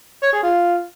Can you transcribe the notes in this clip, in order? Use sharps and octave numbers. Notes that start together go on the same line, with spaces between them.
C#5
G#4
F4